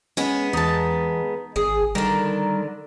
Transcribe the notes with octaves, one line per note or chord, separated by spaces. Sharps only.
G#3 B3 C#4 G#4
E2 D#4 A5
G#1 G#4
D3 D#3 G3 A#4